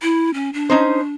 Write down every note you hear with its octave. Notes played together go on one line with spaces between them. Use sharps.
E4
C#4
D4
C#4 D#4 C5